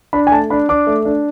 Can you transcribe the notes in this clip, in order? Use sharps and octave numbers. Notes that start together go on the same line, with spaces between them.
D4 B5
G#5
A3 A5
D4 B5
D4 D6
A3
D4